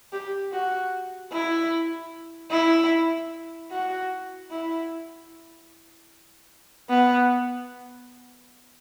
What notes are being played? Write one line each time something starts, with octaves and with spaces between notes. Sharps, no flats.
G4
F#4
E4
E4
F#4
E4
B3